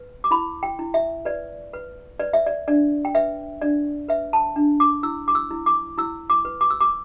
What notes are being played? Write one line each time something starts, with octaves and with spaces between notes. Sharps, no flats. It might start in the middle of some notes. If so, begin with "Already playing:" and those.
Already playing: B4
D6
E4 B5
G5
E4
E5
B4 D5
B4
B4 D5
E5
D5
D4 D5
G5
B4 E5
D4 D5
B4 E5
A5
D4
D6
E4 E6
D6
E6
E4
D6
E4 E6
D6
B4
D6
E6
D6